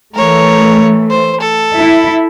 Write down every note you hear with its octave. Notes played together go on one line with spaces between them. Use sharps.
E3 A3 A#4 C#5
C5
A4
E4